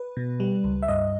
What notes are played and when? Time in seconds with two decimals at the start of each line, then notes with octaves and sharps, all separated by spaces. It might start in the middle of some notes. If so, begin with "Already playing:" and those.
Already playing: B4
0.17 B2
0.40 G3
0.64 C#2
0.82 E5
0.88 G2 D#5